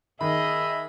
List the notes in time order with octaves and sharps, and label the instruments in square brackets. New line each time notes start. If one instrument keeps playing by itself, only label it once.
[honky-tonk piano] D#3 [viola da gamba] G#4 D#5 [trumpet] E5 [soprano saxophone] B5